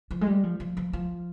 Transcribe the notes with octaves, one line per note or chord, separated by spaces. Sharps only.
F3
G#3
G3
F3
F3
F3
F3